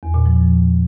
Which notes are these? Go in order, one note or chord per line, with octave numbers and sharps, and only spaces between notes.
E2
A#2
F3